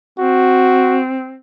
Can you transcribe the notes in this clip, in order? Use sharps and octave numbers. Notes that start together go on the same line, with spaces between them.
C4 F#4